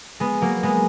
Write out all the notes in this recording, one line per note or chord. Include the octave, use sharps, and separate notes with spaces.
G#3 B3
F#3 A#3
G#3 B3